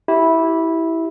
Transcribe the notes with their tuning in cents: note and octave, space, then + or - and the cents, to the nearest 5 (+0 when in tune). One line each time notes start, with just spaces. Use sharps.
E4 -10 G4 -25